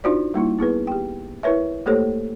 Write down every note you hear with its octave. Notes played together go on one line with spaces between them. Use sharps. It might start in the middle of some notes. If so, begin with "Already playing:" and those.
D4 D#4 F4 F#4 C5 D5
G3 A#3 D#4 E4
B3 E4 G#4 B4
G4 G5
E4 A#4 B4 C#5 E5
A3 A#3 G4 A4 C5 C#5